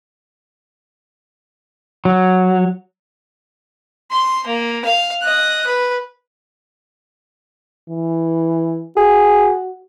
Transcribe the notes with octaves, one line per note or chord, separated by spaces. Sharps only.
F#3
C6
A#3
F5
D#5 F#6
B4
E3
F#4 G#4